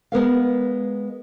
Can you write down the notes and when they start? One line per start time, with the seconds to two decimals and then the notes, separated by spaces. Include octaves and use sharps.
0.12 G#3 B3 A#4 F5